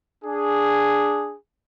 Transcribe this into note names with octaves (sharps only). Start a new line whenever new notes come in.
D4 G#4